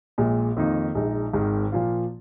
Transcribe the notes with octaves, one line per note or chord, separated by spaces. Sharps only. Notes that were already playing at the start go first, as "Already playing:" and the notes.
A#1 A#2 G#3
F2 D#3 A#3 D#4
A#1 A#2 G#3 D#4
G#1 G#2 D#3 G#3
A#2 F3 A#3 F4